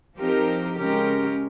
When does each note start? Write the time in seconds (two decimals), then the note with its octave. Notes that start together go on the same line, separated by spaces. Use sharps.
0.17 F3 C4 D#4 G4 A#4
0.79 C#3 G#3 C#4 G4 A#4